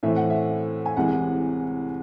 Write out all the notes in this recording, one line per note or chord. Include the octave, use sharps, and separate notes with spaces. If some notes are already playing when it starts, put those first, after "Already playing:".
A2 E3 A3 C4 E5
F#5
E5
G#5
C2 C3 E3 G#3 F#5